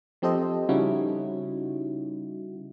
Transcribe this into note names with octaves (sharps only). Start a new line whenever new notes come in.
F3 C4 G4 A4 C5 D#5
C#3 G3 C#4 D#4 E4 F#4